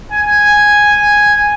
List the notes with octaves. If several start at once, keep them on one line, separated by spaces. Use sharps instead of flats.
G#5